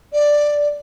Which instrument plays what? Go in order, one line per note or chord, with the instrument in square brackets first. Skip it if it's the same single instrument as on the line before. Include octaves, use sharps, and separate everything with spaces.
[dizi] D5